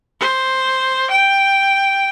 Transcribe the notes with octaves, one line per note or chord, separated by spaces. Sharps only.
C5
G5